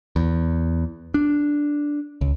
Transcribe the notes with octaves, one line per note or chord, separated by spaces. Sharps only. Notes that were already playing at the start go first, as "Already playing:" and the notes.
E2
D4
C#2